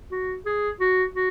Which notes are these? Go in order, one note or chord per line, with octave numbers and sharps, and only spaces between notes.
F#4
G#4
F#4
F#4